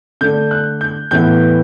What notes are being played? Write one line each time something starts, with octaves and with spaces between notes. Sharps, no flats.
D3 A3 D4 G6
F#6
G6
A2 E3 B3 E4 G6